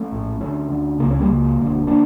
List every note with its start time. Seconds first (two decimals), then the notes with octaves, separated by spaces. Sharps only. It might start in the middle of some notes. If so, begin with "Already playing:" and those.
Already playing: A3 C#4
0.12 A#1 A2
0.40 D2 D3 A3 C#4
0.69 D2 D3
1.00 C#2 C#3 A#3
1.10 C#4
1.21 G3 A#3
1.29 C#2 C#3
1.58 E1 D2 D3
1.87 D3 A#3 D4